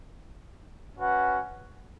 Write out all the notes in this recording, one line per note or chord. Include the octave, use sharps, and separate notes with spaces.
C#4 F#4 B4 F#5